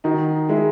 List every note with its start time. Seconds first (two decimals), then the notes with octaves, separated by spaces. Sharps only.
0.04 D#3 D#4 F#4
0.49 G#3 E4 G#4